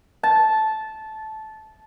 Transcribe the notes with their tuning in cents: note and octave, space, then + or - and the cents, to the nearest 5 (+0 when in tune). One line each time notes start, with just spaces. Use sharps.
A5 -15